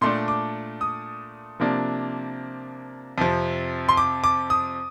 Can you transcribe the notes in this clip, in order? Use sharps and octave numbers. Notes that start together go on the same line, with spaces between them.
A#2 A3 D4 C6
D6
D#6
C3 F3 A#3 D4
F2 C3 F3
C6
D6
D6
D#6